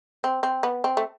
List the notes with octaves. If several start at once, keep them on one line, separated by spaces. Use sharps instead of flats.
C4
C4
B3
C4
A3